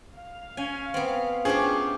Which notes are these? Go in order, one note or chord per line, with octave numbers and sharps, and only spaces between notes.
F5
C#4 G#5
B3 C4
F#2 C#4 D4 F4 G4 G#4 C5